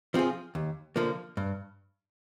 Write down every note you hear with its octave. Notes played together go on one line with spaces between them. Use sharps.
F3 C4 F4 G#4
D#2
D3 F3 A#3
G2